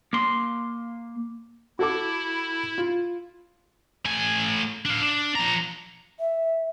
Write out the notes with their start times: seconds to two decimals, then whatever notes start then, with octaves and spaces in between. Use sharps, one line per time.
0.13 A#3 C6
1.79 E4 F#4 A4 D6
2.78 F4
4.05 A2 G#5
4.85 D4 F5
5.02 D4
5.36 F3 A#5
6.20 E5